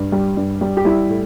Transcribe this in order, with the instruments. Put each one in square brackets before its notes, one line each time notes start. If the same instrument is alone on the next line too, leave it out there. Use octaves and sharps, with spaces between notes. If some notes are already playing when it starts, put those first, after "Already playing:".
Already playing: [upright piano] G2
G3
G2
G3
G4
G3 E4
A2